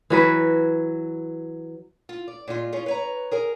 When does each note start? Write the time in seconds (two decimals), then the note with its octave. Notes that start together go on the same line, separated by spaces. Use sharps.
0.10 E3 F#3 B4
2.09 F4
2.28 D5
2.48 A#2 G#3 F4
2.72 C#4 F4 G#4
2.86 B4 C#5 A#5
3.31 G#4 A#4 G#5